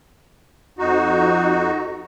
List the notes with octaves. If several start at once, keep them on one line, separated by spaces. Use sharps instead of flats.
F2 D#4 F#4